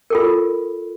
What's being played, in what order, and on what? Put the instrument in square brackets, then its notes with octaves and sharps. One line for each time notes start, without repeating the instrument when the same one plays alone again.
[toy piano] F4 A4 A#4